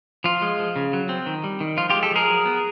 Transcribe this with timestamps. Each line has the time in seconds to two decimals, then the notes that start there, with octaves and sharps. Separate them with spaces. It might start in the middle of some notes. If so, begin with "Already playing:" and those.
0.24 F3 F4
0.42 G#3
0.59 F3
0.76 C#3
0.93 F#3
1.09 C4
1.26 D#3
1.44 G3
1.60 D#3
1.77 F3 F4
1.90 F4 G4
1.94 G#3
2.03 G4 A4
2.11 F3 G#4 A#4
2.28 F#3
2.45 B3